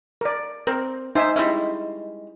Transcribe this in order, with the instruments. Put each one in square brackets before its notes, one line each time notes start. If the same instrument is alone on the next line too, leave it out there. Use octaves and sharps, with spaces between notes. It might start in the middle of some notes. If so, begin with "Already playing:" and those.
[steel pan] A#4 D5
[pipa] C4 [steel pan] A#4
[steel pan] D#4 E5 G#5 [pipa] C5
[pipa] G3 G#3 C#4 [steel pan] E4 E5